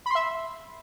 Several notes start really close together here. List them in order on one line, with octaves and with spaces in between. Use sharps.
B5 C6 E5